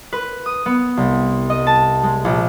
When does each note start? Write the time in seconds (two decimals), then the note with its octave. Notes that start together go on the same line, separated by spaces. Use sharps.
0.13 B4
0.46 D#6
0.66 B3
0.97 C2
1.50 D#5
1.67 A5
2.03 G#3
2.25 A#1